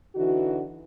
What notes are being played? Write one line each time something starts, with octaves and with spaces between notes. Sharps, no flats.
D3 E3 D#4 F#4